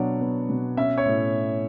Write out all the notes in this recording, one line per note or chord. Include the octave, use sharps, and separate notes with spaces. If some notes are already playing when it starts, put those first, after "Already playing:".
Already playing: B2 F#3 B3 D4 C#5 D5 F#5
B3
B2
C#4 E5
C#5
A2